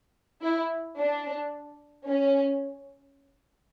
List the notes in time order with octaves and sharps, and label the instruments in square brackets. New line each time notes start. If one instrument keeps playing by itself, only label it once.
[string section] E4
D4
C#4